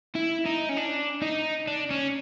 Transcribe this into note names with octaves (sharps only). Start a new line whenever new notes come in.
E4
D#4
C#4
D4
D#4
D4
C#4